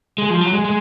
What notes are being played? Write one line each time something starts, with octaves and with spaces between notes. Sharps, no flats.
G#3
F3
F#3
G#3
G#3